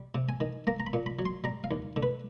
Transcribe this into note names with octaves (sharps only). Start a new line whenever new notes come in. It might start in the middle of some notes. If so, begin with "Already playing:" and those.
Already playing: G3
C3
G#5
D#3
A#3 A#5
A#5
B5
A#2
B5
F#3
C6
G3 A#5
F5
D#2
D3
B4